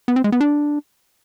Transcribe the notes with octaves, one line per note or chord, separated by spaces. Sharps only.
B3
C4
G#3
B3
D4